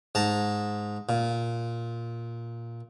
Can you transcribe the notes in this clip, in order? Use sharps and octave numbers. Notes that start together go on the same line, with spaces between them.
G#2 A5 A#5
A#2